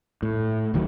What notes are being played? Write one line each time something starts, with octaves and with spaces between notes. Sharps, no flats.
A2
D1 D#3 E3 F#3